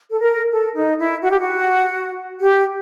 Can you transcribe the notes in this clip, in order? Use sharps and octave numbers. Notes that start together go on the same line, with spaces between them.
A4
A#4
A4
D#4
E4
F#4
G4
F#4
G4